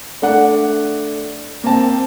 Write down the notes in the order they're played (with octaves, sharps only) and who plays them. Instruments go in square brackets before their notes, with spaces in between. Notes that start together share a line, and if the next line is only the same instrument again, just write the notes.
[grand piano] A3 D4 F#5
A#3 C4 A5